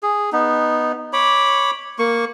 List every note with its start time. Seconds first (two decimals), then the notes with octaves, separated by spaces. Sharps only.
0.03 G#4
0.33 B3 D#4
1.13 C#5 B5 D6
1.99 A#3 C#6